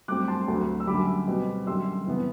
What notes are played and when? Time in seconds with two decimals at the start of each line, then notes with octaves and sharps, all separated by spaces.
0.08 G2 F#3 A3 C4 D6 F#6
0.28 A5 C6
0.48 D2 D3 F#3 A3
0.80 E6
0.87 F#2 D3 G3 B5 D6
1.27 B2 G3 C4
1.67 F#2 D3 G3 C6 E6
2.07 E2 C3 G3 B3